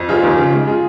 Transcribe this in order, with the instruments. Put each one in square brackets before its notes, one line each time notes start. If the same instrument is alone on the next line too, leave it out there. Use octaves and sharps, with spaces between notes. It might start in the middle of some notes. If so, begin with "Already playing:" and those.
Already playing: [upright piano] F2
F1 F4 G#4
D#2
C#3
G#3
F4 G#4